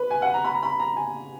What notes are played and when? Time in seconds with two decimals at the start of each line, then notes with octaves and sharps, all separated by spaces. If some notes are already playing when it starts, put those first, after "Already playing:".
Already playing: B4
0.11 G#5
0.22 F#5
0.34 A#5
0.45 B5
0.54 A#5
0.62 B5
0.79 A#5
0.96 G#5